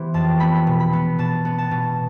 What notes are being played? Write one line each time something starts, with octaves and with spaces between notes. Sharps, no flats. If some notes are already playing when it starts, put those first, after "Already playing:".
Already playing: E3 B3 G4 C5
F2 A5
B3 B5
B2
B5
B3
B2 A5
B3
A5
B2